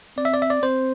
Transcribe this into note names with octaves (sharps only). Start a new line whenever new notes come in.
C4 D5
E5
D5
E5
D5
C4 C5